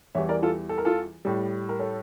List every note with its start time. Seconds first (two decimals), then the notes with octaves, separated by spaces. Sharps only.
0.15 E2 E3 G3 C#5 E5
0.29 A#4 D5
0.42 F4 A4
0.69 A4
0.78 A#4
0.85 F4 A4
1.25 A2 G3
1.69 A#4
1.80 A4 C#5